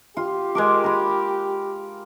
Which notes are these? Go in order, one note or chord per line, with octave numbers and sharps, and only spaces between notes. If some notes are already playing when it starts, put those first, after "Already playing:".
F4 G4
G#3 A#4 D6
A#4 B5